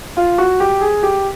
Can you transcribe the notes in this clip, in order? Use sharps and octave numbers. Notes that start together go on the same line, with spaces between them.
F4
F#4
G4
G#4
G4